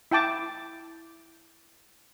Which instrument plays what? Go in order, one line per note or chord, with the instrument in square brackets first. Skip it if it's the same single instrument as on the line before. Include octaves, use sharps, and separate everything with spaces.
[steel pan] E4 G5 A5 D6